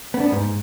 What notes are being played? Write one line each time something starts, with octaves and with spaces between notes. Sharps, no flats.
B3
D4
B3
G#2